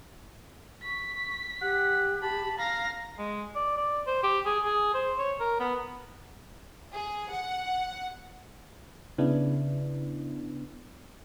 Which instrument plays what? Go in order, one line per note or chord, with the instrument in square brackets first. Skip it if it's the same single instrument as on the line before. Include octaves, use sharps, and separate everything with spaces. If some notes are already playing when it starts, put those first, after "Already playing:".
[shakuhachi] C#6 [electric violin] B6
[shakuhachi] G4 [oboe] F#5
[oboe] A5 [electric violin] B5
[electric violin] F5 A#6 [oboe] A#5
[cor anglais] G#3
D5
D5
C5
G4
G#4
G#4
C5
C#5
A#4
B3
[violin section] G#4
F#5
[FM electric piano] C#3 B3 D4 E4